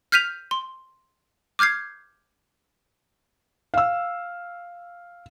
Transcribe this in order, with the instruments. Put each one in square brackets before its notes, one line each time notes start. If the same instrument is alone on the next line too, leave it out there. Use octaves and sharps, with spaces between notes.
[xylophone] F6 G6 B6 D#7 F7
C6
D6 F6 G6 G#6 C7
[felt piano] F5 E6